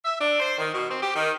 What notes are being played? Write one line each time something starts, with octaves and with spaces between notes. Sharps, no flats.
E5
D4
C5
D#3
B2
C4
G4
D#3